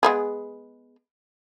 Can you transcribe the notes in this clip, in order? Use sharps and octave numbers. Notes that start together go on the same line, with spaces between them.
G#3 B3 G#4